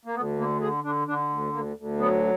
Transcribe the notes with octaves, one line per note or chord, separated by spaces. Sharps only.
A#3
D2 B3
D3 A#3
D3 G#4
D3 D4
D3 D4
D2
D2 A#3
D2
F#3 B3